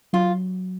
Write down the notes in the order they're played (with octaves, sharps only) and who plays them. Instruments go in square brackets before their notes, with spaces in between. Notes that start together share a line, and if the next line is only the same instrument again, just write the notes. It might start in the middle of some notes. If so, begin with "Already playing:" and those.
[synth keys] F#3 [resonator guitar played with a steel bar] F4